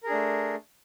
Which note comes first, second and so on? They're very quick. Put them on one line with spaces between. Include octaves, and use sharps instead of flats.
A#4 G#4 D4 A3